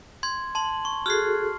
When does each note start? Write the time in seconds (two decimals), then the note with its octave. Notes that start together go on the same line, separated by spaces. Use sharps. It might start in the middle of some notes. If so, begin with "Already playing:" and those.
0.23 C6 G#6
0.55 A5 C6 F#7
0.85 C#6
1.06 F#4 G#4 A4 F6 C7